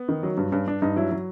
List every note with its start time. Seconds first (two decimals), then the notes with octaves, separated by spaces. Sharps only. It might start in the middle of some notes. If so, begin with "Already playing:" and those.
Already playing: B3
0.09 D#3
0.23 F#3
0.38 G2
0.52 G2 C#4
0.67 G2 D4
0.82 G2 D#4
0.96 F#3 E4
1.11 F#3